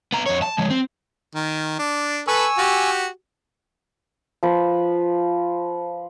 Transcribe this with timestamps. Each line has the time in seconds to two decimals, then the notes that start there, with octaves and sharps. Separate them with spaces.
0.13 B3 A#5
0.26 F2 C#5
0.42 A5
0.58 F3 G#3
0.70 C4
1.35 D#3
1.79 D4
2.28 A4 B4 G#5 C#6 E6
2.58 F#4 G4
4.43 F3 B4